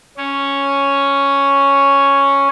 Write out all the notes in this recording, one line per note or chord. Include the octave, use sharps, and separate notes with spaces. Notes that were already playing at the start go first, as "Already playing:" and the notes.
C#4 C#5